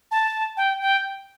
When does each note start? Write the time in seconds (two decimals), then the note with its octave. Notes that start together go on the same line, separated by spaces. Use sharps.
0.11 A5
0.57 G5
0.81 G5